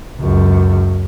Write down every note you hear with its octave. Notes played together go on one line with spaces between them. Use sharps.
C#2 F#2